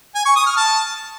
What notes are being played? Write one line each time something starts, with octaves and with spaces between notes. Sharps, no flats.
G#5
C#6
D#6
F6
A5